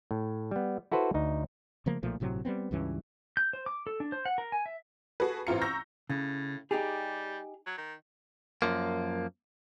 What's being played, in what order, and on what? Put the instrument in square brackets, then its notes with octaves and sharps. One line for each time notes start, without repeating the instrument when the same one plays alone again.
[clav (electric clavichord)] A2
G3 B3
E4 F#4 A4 B4 C5
D2 D#4
[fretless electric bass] C#3 F3 A3 A#3
B1 A#2 F3 A3
G1 A2 C3 F#3
G3 A3 B3 C4
C#2 G2 E3 C#4
[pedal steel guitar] G6
C5
D6
A4
D4
C5
F#5
A#4
G#5
E5
[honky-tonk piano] F#4 G#4 A4 B4
A1 E3 C4 F4 A#5 C#7
A#5 C#6 E6 G6 A#6
[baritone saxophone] A2 [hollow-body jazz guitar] C#3
[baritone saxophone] G3 [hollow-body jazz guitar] D#4 G4 G#4
[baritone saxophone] F#3
D#3
[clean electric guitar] F#2 F3 A#3